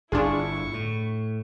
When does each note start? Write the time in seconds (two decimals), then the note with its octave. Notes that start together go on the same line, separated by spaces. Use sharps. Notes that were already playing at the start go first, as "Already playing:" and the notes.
0.12 G1 D4 E4 F4 G#4 C#6
0.73 A2